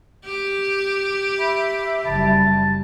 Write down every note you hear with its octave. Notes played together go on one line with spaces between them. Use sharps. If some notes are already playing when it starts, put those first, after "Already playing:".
G4
E5 B5
F#1 G3 A5